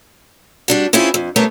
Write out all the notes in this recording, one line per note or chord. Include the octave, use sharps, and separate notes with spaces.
G3 D4 F#4
C4 C#4 E4 F4 G#4
F2
G3 A3 B3 C#4 A#4 C#5